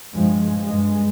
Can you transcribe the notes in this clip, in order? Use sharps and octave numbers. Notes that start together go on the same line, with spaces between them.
G2 F3 G#3
G2 G#3